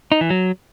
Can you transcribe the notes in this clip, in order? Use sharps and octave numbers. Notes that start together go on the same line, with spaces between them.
D#4
E3
F#3